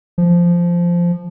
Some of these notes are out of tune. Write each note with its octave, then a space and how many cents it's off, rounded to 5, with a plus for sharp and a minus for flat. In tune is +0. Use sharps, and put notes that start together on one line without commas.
F3 -10